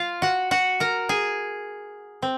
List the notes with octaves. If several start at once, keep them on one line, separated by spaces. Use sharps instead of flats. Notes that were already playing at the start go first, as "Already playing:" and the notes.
Already playing: F4 F5
F#4 F#5
F#4 F#5
A#4 A#5
G#4 G#5
C4